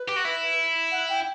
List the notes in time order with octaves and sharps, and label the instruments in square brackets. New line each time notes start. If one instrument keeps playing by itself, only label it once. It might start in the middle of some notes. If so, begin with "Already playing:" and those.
Already playing: [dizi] B4
[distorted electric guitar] G4
F#4
E4
[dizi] F#5
G5